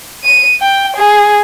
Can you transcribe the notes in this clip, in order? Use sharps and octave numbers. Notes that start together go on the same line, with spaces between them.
D#7
G5
G#4